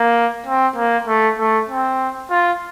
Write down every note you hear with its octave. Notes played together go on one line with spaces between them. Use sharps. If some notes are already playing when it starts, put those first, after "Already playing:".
Already playing: A#3
C4
A#3
A3
A3
C4
F4